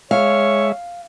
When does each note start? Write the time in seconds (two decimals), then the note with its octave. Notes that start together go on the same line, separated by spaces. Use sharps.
0.11 G#3 C#5 E5 F5